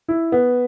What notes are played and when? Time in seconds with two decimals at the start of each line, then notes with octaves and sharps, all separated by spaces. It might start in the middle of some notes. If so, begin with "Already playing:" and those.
0.08 E4
0.32 B3